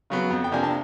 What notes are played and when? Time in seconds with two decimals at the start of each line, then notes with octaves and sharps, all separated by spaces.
0.10 C#3 F#3 B3
0.31 F2
0.44 G5
0.52 C3 F3 A#3 D4 G#5
0.63 A5